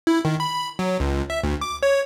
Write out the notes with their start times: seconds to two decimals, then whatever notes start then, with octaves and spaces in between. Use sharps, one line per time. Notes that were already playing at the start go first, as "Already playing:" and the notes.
0.07 E4
0.25 D#3
0.40 B5
0.79 F#3
1.00 C#2
1.30 E5
1.43 D2
1.61 D6
1.83 C#5